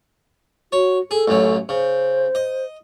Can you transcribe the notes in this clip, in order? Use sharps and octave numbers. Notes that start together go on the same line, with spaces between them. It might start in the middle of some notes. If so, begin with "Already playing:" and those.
F#4 C#5
G#4 A4
A1 F#2 F#3
C#3 C5
D#5